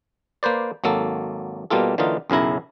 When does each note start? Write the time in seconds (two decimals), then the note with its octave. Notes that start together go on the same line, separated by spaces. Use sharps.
0.43 A#3 B4 C5 D5
0.84 G#1 F#3 A#3 A4
1.70 B2 G3 A#3 F4 A4
1.98 D3 E3 F#3 A#3 D#4 F4
2.30 B1 F#2 C#3 E4 A#5